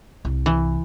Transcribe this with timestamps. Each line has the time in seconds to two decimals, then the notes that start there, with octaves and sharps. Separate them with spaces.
0.25 C2
0.46 E3